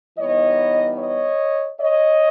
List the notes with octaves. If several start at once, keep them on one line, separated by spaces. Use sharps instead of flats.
E3 G3 B3 D#4 C#5 D#5
C#5 D#5
C#5 D#5